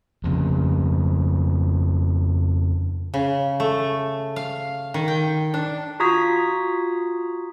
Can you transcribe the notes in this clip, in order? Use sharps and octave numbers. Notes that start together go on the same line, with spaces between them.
F2 C#3
C#3
A3
F5
D#3
G5
D4
F4 F#4 A#5 D#6 G#6 B6